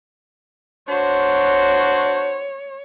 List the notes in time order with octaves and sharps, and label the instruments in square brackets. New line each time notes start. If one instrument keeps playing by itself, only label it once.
[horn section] D4 F#4 C5 [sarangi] C#5